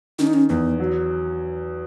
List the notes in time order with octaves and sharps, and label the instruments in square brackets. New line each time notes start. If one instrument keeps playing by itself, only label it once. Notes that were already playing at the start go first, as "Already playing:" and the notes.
[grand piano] D#3 [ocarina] C#4
[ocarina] D#4
C#4
[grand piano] E2 [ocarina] B3
[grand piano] F#3